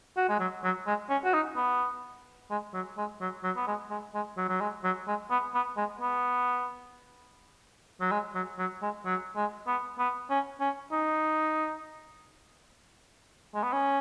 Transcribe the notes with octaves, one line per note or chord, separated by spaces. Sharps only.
F#4
G#3
F#3
F#3
G#3
C#4
F#4
D#4
B3
G#3
F#3
G#3
F#3
F#3
B3
G#3
G#3
G#3
F#3
F#3
G#3
F#3
G#3
B3
B3
G#3
B3
F#3
G#3
F#3
F#3
G#3
F#3
G#3
B3
B3
C#4
C#4
D#4
G#3
B3
C#4